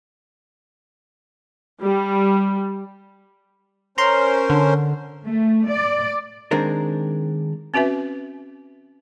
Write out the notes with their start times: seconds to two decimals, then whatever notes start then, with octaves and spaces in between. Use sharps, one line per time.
1.81 G3
3.98 C#4 A#4 C5 A#5 C6
4.50 D3
5.26 A3
5.68 D5
6.51 D#3 G#3 C4 D4 A#4
7.74 C4 C#4 F#4 B4 E5